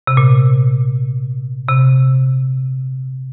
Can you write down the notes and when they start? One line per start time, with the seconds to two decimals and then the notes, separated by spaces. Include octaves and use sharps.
0.07 C3
0.17 A#2
1.68 C3